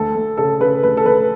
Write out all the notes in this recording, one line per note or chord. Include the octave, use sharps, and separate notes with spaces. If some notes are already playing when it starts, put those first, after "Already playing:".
Already playing: D2 A4
D2
C#3 A4
C#3 B4
D2 B4
A4
D2 B4